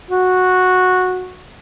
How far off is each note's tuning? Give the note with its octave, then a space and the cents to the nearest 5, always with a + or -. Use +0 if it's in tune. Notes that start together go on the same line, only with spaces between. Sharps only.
F#4 -10